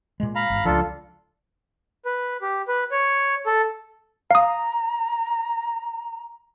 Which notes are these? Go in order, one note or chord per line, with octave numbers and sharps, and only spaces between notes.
A#2 G#3
F5 A#5 B5
G1
C#2 F3 D4 F4 A4
B4
G4
B4
C#5
A4
F5 A#5 D#6